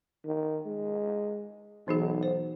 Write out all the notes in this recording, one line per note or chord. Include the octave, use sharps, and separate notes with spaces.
D#3
G#3
B1 E3 D#4 G#4
C5